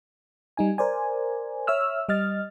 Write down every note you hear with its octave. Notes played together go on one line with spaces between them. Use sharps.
G3 D#4 G#5
A#4 C5 D5 G#5
C#5 E5 E6 F6
G3 D#5 F6 A6